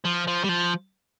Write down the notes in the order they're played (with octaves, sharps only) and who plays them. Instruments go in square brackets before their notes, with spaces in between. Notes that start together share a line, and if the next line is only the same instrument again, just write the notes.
[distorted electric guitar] F3
F3
G3
F3